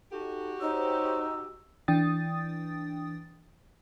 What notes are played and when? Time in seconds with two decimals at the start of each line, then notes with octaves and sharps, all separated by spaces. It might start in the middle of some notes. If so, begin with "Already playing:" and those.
0.12 D#4 F#4 G4 A4
0.61 D#4 C5 C#5 E6
1.88 E3 D4 G5 D#6 A6